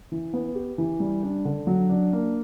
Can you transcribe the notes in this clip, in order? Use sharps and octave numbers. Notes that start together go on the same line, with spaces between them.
E3
B3
G4
E3
G3
D4
D3
F#3
D4
A#3